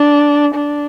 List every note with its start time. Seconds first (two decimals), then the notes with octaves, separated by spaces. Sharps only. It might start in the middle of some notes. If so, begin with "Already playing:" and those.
Already playing: D4
0.54 D4